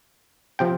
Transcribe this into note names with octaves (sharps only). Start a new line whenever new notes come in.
C3 F3 C4 G5